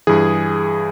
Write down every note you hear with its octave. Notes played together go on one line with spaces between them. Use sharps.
G2 E3 G#4